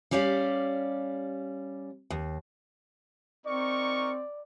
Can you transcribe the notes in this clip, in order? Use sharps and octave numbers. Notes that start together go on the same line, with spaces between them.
G3 C#4 G4 D5 F5
D#2
C4 D#4 A#4 D5 C#6